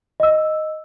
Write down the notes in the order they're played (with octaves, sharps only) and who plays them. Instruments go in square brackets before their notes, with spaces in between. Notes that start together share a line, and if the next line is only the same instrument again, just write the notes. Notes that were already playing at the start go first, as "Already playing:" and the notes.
[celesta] D#5 E6